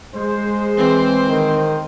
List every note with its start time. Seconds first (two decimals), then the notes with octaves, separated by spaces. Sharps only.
0.15 G#3 C5
0.77 E3 C4
1.29 D#3